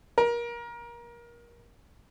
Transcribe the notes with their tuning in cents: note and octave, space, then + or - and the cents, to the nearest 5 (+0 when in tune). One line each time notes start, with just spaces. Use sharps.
A#4 +25